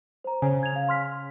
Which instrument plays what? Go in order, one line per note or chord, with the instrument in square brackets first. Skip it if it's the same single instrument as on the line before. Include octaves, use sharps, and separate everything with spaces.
[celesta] C5 A#5
[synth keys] C#3 [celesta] C5 G#5
[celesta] G#6 F7
F5
C6 F6 B6